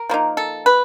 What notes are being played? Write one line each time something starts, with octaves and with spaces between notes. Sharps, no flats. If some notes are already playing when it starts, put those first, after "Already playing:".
Already playing: A#4
F3 A#3 D#4
A4
B4